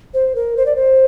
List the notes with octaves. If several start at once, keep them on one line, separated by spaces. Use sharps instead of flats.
C5
A#4
C5
D5
C5